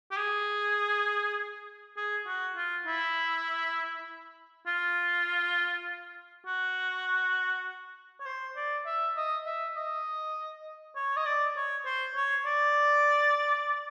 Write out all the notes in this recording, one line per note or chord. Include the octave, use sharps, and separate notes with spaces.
G4
G#4
G#4
F#4
F4
E4
F4
F#4
C#5
C5
D5
E5
D#5
E5
D#5
C#5
D#5
D5
C#5
C5
C#5
D5